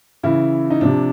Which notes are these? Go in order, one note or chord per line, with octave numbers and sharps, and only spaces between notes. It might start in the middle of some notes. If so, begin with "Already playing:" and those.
C#3 E3 E4
D#4
C3 F3 D4